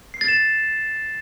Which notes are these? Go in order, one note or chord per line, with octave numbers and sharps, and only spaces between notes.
C7
A6
E7